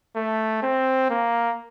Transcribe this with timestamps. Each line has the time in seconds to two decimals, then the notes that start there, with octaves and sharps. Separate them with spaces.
0.16 A3
0.62 C4
1.10 A#3